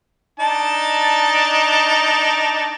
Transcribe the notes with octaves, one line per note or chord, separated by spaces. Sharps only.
D4 D#4 A5